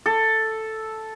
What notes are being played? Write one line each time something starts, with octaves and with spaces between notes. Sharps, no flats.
A4